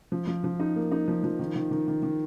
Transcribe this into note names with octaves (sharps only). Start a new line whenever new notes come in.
F3
F3
F3
D#4
A#3
D#4
F3
F3
D#3
D#3
D#3
D#3
D#3